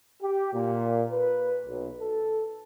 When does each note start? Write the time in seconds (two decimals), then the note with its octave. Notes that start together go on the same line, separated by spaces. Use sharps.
0.21 G4
0.53 A#2
1.11 B4
1.67 B1
2.00 A4